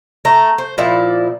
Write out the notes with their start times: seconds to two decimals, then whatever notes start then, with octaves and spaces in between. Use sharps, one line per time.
0.25 A3 A#5
0.58 C5
0.78 A#2 F3 E4 D5